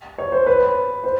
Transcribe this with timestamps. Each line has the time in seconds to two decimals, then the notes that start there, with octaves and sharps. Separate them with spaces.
0.18 C#5
0.32 C5
0.46 B4
1.04 C5